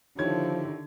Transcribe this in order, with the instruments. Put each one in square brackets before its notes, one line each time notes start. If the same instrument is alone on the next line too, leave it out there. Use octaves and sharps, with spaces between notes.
[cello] D3 [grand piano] D#3 C#5 G#6 [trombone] F3 [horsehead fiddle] E4 G4